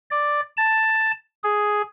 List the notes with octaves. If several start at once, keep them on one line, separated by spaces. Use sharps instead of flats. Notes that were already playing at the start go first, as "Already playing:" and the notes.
D5
A5
G#4